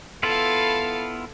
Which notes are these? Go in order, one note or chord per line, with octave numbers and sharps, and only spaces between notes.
B3 E4 F4 A4 F5